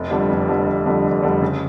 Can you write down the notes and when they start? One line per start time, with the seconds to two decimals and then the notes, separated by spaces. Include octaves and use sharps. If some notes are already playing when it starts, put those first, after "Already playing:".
Already playing: F1
0.11 F2 D3 G3
0.29 F1
0.48 F2 D3 G3
0.66 F1
0.86 F2 D3 G3
1.04 F1
1.23 F2 D3 G3
1.42 C#3